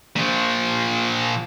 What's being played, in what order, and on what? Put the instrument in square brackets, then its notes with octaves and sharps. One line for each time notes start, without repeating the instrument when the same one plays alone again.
[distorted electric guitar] A#2 F3